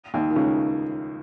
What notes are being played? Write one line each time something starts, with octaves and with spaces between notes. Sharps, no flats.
D#2 D#3
D#3
C#2 C#3